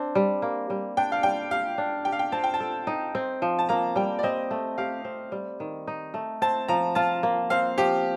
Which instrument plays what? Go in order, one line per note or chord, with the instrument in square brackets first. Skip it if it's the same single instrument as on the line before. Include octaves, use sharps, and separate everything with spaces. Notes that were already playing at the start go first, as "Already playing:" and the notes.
Already playing: [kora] C4 D4
G3
A#3
G3
[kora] D4 [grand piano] G5
[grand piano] F5
[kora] G3 [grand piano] G5
[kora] G4 [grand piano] F5
[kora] D4
[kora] G4 [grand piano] G5
[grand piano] F5
G5
[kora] C4 [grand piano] A5
[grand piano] G5
A5
[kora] A4
D#4
C4
F3
[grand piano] A5
[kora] A#3 [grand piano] A#5
[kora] G3 [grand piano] G5
[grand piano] D5
[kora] C4 [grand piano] D#5
[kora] A3
[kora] G4 [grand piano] F5
[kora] C4
G3
D#3
D#4
A3
[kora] C4 [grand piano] A5
[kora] F3 [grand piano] A#5
[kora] F4 [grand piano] A5
[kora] A#3
[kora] C4 [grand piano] F5
[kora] F3 [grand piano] G4